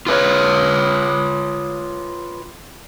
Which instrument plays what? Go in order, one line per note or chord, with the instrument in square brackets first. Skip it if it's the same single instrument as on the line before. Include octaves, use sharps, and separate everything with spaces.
[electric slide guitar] F4 B4 C#5